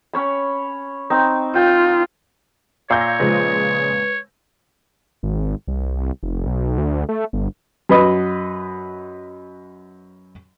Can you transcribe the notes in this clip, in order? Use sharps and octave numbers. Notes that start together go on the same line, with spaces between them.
C#4 C#5 B5
C4 D#4
F4 G5
A#2 C#5 F5 E6 G6 A#6
C#3 F3 G#3 B4
G#1
C2
F1
B1
D2
A3
G1
F#2 B4 D#5